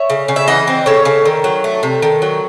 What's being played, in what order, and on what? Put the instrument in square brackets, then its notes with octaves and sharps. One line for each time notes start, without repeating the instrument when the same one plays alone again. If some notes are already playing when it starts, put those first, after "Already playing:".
Already playing: [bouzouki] C#5 E5
C#3
C#3
E5
E3 D#5 F#5
C4
C#3 A4 C#5
C#3
D#3
F#3
A3
C3
D#3
F#3